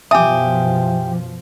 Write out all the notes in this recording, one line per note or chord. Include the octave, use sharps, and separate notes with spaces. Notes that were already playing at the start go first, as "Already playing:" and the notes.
F#2 B2 F3 G4 E5 G#5 D#6